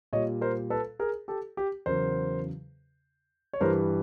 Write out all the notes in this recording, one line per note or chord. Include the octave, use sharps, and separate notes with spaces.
A#2 G3 C#5 D#5
A#4 C5
A4 B4
G#4 A#4
G4 A4
G4
E2 C#3 F#3 A#4 C5
C#5
G2 E3 G3 A#4 C5